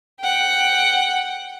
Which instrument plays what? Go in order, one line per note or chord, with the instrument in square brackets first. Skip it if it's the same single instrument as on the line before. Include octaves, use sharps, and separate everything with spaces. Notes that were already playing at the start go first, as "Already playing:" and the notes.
[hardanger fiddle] F#5 G5